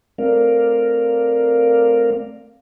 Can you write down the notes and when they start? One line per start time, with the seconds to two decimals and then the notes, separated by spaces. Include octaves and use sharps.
0.18 A3 C4 A#4 D5 F5